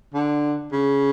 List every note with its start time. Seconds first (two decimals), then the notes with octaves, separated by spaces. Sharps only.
0.14 D3
0.73 C#3